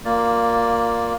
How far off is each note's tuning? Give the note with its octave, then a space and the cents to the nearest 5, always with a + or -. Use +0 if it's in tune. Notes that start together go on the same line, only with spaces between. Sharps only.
A#3 +0 F4 +15 D5 +0